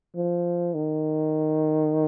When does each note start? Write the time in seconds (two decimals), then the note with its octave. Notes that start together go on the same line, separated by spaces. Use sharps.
0.16 F3
0.74 D#3